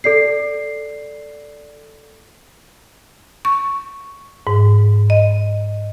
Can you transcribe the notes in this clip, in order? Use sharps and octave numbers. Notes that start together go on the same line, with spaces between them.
A4 D5 C7
C#6
G#2
D#5